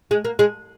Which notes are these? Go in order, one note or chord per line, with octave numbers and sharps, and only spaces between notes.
G#3
A#3
G#3